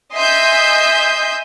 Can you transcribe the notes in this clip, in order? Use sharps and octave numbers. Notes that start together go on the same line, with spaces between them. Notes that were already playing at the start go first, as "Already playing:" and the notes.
D#5 E5 G#5 C6 G6